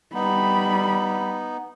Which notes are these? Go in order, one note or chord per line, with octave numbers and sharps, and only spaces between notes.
G3 B3 D#4 B5